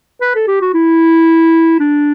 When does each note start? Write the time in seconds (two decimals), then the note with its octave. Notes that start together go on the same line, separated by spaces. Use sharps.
0.22 B4
0.35 A4
0.47 G4
0.61 F#4
0.74 E4
1.80 D4